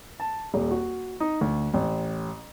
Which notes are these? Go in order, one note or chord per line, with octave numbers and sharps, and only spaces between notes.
A5
D#1
F#4
D#4
D2
A1